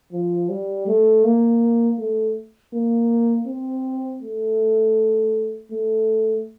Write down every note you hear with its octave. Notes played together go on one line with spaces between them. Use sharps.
F3
G3
A3
A#3
A3
A#3
C4
A3
A3